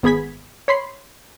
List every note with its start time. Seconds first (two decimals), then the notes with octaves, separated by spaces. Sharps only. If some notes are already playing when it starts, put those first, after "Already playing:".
0.03 G#1 B3 G#4 B5 G#6 B6
0.68 C#5 B5 C6 C7